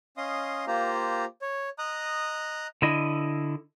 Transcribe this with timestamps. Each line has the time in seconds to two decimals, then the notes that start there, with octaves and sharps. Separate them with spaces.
0.17 C#4 D#5 F5 C6 D#6
0.67 A#3 F4 G4 C5 A#5
1.42 C#5
1.79 D#5 A#5 D#6 F#6
2.82 D3 E4 D#5